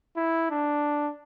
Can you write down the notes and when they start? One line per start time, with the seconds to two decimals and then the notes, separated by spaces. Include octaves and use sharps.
0.16 E4
0.50 D4